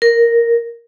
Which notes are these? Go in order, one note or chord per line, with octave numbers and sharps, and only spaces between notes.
A#4